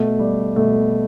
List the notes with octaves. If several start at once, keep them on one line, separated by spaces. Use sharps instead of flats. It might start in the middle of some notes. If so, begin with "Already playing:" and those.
Already playing: B2 A3
G3
B2 A3